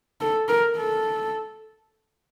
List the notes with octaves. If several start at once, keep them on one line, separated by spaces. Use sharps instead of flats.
A4
A#4
A4